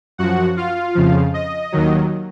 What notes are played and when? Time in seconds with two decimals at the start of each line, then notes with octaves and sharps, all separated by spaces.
0.18 F#2 F3 F#4 F#5
0.57 F4 F5
0.95 F2 C#3 F3
1.34 D#5
1.72 D#2 D#3 F#3